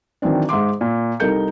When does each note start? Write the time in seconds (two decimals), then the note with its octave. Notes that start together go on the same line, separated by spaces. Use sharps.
0.22 D#3 E3 F#3 C4 D4
0.49 G#2 E5 C6 D6
0.81 A#2
1.20 C2 D#4 A4 A#4 G6 C#7